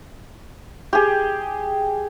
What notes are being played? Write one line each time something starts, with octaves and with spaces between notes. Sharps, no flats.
G4 G#4